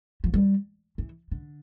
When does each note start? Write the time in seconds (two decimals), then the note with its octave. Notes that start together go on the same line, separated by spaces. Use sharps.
0.24 F3
0.34 G3
0.98 E3
1.31 D3